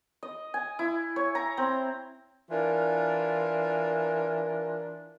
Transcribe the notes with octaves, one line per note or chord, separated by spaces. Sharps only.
D#5
G#5
E4
C#5
A#5
C4
E3 D4 F4 A#4